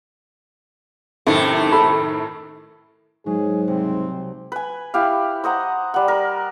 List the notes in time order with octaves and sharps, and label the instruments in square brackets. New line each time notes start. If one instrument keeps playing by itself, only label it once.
[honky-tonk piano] F#2 A2 D#3 [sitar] C3 A3
[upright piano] A4 [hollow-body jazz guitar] B5
[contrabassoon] G#2 [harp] F#3 [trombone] G#4
[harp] C2 [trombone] C4
[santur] B4 G#5
E4 G4 F5
C5 D#5 F#5 A#5
G3 F#5
A#4